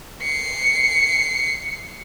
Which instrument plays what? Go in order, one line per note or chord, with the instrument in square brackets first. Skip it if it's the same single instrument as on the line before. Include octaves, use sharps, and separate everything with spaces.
[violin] C7 C#7